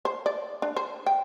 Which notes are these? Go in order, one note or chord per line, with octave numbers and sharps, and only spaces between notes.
C5
D5
D4
C5
G5